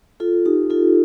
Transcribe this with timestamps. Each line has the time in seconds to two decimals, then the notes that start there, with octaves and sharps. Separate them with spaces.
0.20 F4 A4
0.45 D#4 G4
0.70 F4 A4